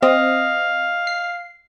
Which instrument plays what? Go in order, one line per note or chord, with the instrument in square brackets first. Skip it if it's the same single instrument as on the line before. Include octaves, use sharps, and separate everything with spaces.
[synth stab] C4 [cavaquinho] D#5 [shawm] F5
[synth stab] C7